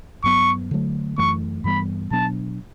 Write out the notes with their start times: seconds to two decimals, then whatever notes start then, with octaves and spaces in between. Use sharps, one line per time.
0.24 G2 F#3 B3 C#6
0.71 D3 F#3 A3
1.18 F#2 E3 A3 C#6
1.64 G2 E3 G3 B3 B5
2.11 B2 F#3 B3 D4 A5